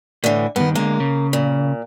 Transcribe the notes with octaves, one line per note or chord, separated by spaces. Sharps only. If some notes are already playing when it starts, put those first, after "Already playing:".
A2 D3 E3
G2 D#3 B3
D3 G#3 A#3
C#3
A#2